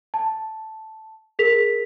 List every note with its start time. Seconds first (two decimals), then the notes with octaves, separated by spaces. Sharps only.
0.14 A5
1.39 G#4 A#4 B6 F7